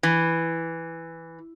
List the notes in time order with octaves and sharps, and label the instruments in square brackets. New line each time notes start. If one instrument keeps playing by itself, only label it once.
[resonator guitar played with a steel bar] E3